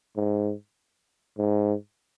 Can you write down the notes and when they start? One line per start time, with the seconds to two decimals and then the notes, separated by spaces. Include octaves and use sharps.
0.16 G#2
1.38 G#2